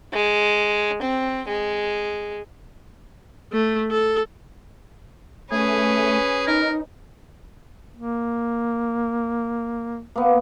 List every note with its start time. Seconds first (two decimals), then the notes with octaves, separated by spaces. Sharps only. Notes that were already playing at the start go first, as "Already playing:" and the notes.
0.13 G#3
1.02 C4
1.48 G#3
3.53 A3
3.91 A4
5.52 A3 C#4 G#4 B4
6.47 D#4 A#4
7.97 A#3
10.16 A#3 B3